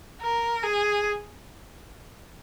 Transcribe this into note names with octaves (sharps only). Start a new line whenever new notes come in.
A#4
G#4